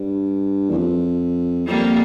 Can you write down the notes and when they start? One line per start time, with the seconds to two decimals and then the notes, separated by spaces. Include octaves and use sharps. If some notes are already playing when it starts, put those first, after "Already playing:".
Already playing: G2
0.70 E2
0.78 F2
1.68 F2 G3 A#3